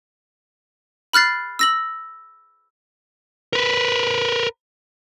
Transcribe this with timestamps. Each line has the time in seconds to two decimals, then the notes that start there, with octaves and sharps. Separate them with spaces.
1.13 B5 F6 F#6 A6 C7
1.59 E6 A#6 F#7
3.53 A#4 B4